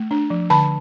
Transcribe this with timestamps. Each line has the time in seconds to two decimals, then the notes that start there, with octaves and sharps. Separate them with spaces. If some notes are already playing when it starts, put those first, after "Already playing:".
Already playing: A3
0.11 D4
0.30 F3
0.50 D3 A5 B5